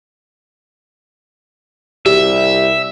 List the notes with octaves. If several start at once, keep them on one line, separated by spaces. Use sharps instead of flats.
C2 G3 E5